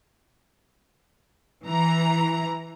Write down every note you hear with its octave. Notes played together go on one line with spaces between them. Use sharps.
E3 A#5